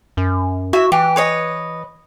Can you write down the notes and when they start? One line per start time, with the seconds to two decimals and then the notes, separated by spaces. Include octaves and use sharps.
0.17 F#2
0.73 E4 F#4 E5
0.92 E3 G4
1.16 B4 C#5 D#5